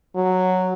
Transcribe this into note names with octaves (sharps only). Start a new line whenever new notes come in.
F#3